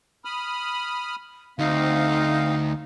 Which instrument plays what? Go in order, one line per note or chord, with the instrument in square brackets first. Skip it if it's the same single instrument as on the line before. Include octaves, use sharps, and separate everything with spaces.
[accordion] B5 D#6 F6
[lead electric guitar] D2 [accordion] C4 F5 [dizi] D#4